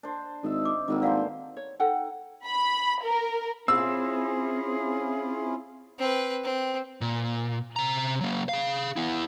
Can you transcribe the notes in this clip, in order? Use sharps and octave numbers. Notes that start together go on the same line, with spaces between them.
D4 C5
G#1 D#5 E5
D6
G#1 F#3 G3 A#3
D3 E3 C5 D5 F5 F#5
C#5
D#4 A4 F#5 G5
B5
A#4
C4 C#4 E4 F4 G#4 E6
C4 B4
C4
A#2
C3 A#5
F#3 A#3
G#4 F5
B3 E4